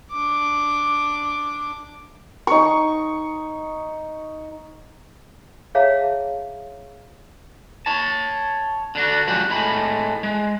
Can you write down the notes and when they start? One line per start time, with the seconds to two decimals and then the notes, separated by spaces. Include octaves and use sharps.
0.11 D4 D6
2.47 D#4 C#6
5.75 G#4 C#5 E5 F5 A5 A#5
7.86 C#5 A5
8.95 D3 D4 F#4
9.27 F#2 F3 G#3 G4 C#5 F#5
9.50 A2 G#3 A3 B5
10.23 G#3